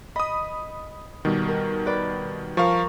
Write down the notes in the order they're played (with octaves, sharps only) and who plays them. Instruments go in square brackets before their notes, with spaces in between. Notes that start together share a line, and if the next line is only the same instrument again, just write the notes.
[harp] D#5 [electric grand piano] B5 D#6
[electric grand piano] B2 D#3 [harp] G3
[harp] A#4
B4 D5 B5
[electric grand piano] F3 F5 [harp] A#4 A#5 C#6